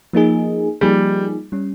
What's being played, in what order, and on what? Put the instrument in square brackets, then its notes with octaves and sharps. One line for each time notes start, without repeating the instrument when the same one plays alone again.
[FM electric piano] F3 A#3 D#4 G#4
[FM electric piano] F3 A#3 D#4 G#4 [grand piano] G3
[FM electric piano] G3 C#4